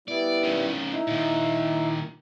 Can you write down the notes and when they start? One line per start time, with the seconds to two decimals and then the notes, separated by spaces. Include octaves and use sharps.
0.08 G3 B3 E4 D5
0.43 D#3 C#4
0.92 D#4 E4
1.07 A#2 D#3